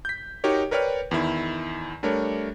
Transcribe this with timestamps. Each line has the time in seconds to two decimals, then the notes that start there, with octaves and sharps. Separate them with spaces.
0.05 G6 B6
0.44 D#4 F#4 G4 A#4 C#5
0.71 A#4 B4 C#5 D5 G5 F6
1.11 E2 D#3 E4
2.03 G3 A3 D4 A#4 C#5